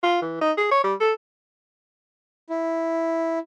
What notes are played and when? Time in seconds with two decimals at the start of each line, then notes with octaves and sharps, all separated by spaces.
0.03 F4
0.22 E3
0.41 D#4
0.57 G#4
0.71 C#5
0.84 G3
1.00 A4
2.50 E4